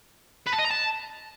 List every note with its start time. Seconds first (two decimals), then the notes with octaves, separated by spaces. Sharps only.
0.47 B4
0.53 A5
0.59 D#5
0.65 A#5
0.71 A5